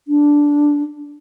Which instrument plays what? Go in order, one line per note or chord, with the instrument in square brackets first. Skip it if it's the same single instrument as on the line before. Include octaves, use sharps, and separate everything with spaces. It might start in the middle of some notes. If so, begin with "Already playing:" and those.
[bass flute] D4